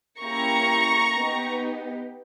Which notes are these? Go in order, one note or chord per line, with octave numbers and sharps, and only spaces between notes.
A#3 C#4 E4 G4 A#5 C#6
B3 D#4 G4